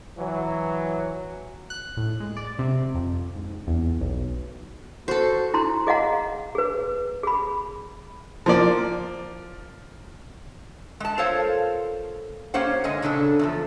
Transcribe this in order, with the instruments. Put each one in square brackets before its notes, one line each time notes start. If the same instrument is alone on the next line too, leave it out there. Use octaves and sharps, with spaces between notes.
[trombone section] E3 F#3
[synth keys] F#6
A2
G#3
D5
C3
F2
G#2
E2
B1
[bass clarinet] F#4 [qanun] A4 C5
[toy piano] E4 A#5 C6
G#4 D#5 F5 F#5 A#5
G#4 B4
G#4 B5
[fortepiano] F3 A#3 D5
[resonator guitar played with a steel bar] G#3 A5
F4 A4 A#4 C5 C#5 F5
A#3 C#4 G4 C5 F#5
G#2 D3 D#5 G#5
A#2 C#3 D4 A4
E2 D#3 F3